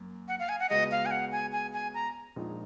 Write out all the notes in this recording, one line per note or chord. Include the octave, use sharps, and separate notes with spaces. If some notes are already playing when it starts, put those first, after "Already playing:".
Already playing: F#2 A#3
F#5
F5
G#5
F#5
C#2 C#3 G#3 B3 F#4 D#5
F5
G#5
F#5
G#5
G#5
G#5
A#5
A#1 A#2 F3 G#3 D#4